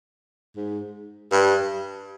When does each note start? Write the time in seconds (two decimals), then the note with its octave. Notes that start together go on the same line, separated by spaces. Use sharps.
0.57 G#2
1.32 G2